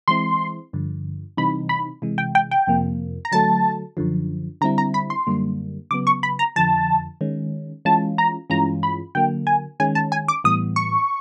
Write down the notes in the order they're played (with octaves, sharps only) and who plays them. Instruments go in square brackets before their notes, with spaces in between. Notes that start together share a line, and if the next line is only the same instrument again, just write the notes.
[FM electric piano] E3 G#3 C4 E4 [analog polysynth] C6
[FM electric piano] G2 D3 F3
[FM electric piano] C3 E3 G3 C4 D#4 [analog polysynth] B5
[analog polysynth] B5
[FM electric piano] C3 E3 G#3
[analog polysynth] G5
G5
G5
[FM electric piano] F2 C3 F3 A#3
[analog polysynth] A#5
[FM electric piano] D3 F#3 A3 [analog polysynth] A5
[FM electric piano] F#2 D3 F3
[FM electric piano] D3 G3 C4 E4 [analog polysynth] A#5
[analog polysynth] A#5
B5
C6
[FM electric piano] F#2 D3 G3 A#3
[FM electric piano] C#3 F#3 B3 [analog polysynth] D6
[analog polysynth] C#6
B5
A#5
[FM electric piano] F2 D3 F3 [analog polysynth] A5
[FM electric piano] D#3 G#3 C#4
[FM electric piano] E3 G#3 C#4 F4 [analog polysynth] A5
[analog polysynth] A#5
[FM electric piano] G2 E3 G#3 C#4 F4 [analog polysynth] A#5
[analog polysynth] B5
[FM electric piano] D3 F#3 A#3 [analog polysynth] G5
[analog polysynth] G#5
[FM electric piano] D#3 G#3 C#4 [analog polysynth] G#5
[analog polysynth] A5
G#5
D6
[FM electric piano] A2 E3 G3 B3 [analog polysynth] D#6
[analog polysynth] C#6